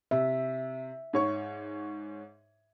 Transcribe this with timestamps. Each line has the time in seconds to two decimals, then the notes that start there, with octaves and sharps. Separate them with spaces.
0.11 C3 E5
1.13 G#2 C#5 C#6